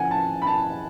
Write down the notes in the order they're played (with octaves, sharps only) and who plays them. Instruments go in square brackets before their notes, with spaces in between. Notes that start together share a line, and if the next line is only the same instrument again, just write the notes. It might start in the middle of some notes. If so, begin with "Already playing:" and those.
Already playing: [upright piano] F3 C#4 F#5 G#5
A5
B5
A5